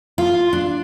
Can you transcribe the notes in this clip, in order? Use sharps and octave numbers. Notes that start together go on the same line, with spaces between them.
F4
D4